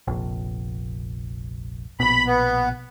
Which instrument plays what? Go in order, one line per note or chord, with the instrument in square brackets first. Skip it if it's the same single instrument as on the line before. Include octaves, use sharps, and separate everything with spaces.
[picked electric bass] F1 A#1
[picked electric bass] A#1 B2 [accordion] B5
[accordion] B3